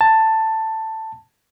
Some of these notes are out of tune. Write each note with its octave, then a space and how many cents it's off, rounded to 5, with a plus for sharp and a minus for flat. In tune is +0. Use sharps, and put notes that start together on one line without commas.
A5 +10